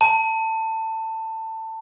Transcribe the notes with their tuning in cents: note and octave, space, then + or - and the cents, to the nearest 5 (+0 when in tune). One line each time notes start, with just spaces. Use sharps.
A5 +20